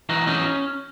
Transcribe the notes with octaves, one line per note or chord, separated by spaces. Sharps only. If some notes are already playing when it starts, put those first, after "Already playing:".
E3 D#4 F#4
C#4 D#4 F#4